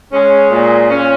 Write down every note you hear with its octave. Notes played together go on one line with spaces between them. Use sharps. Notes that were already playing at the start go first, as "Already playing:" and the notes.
G#3 C#4
A#2
A#2 C#4